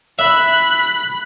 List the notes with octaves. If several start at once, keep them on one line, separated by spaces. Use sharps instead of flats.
E5 B5 F#6